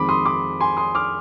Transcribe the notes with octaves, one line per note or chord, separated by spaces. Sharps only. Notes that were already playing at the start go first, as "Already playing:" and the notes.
Already playing: F2 D#3 G#3 C4 B5 D6
C6 D#6
B5 D6
G#5 C6
C6 D#6
D6 F6